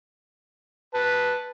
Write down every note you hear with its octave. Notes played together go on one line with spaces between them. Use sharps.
B4 A5